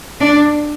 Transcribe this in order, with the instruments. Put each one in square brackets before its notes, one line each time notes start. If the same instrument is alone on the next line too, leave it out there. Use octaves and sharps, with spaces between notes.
[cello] D4